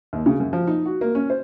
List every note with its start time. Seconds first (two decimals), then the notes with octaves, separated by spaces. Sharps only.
0.13 D#2
0.26 C#3
0.40 F#2
0.53 F3
0.67 D#4
0.86 F#4
1.01 A#3
1.15 C#4
1.30 C5